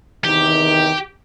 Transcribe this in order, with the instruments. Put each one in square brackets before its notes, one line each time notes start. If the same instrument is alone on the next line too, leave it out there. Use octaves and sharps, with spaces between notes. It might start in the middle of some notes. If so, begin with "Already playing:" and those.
[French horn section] E2 C3 D#3 [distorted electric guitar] G4